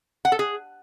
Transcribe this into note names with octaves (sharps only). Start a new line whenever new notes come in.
F#5
A4
G#4